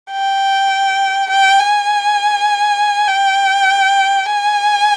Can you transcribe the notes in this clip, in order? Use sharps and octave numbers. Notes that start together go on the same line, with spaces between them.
G5
G5
G#5
G5
G#5